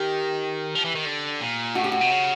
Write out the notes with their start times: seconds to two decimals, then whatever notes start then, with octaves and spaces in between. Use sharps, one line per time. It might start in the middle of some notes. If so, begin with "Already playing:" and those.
Already playing: D#3 G4
0.75 F3
0.84 E3
0.95 D#3
1.05 D3
1.40 A#2
1.75 A2 F#4
1.84 G4
1.92 F#4
2.01 C3
2.11 C#3